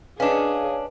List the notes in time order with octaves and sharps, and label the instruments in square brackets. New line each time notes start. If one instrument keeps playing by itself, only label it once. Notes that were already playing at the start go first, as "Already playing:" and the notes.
[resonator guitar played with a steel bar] C#4 D4 [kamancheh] G#4 [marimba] B4 D#5 [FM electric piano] C#5 F5